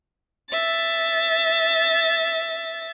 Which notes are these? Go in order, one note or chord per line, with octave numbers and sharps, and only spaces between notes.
E5 A6